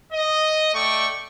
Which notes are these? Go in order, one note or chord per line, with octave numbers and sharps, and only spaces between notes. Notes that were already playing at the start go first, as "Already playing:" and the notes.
D#5
A3 D5 G5 C#6